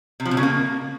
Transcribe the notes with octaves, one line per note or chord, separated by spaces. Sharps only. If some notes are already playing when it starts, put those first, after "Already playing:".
C3
F3
C3
C#3
A#3